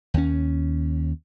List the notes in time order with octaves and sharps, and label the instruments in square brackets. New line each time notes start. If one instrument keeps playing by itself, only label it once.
[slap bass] D#2 C#4